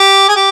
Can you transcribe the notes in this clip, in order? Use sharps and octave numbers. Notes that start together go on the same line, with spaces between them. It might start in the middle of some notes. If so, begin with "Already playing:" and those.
Already playing: G4
G#4
G4